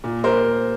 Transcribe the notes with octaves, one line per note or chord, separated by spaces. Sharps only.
A#2
A#4 C5